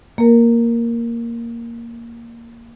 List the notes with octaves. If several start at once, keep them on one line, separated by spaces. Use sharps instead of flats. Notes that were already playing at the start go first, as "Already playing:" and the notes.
A#3 A#4